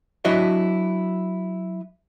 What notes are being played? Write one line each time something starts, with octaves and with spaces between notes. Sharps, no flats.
F#3 D4 E4 F#4 D#5 E5